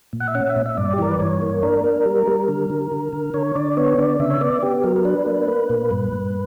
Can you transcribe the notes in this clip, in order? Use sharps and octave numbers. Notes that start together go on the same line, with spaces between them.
A#2
F#5
E5
C#4 F#5
E5
A#2
E5
G2 D5
G4
E3 A#4
B4
G2 C#5
A#3
D4 A#4
A#3
G3
G3
D3
D3
D3
D3
D3 C#5
D3 D5
B3 C#5
D3 D5
C#3 E5
C#5
B3 D5
B3 G4
F#3 A#4
A#4
D4 B4
A#3
A#3
A#2
G2
G2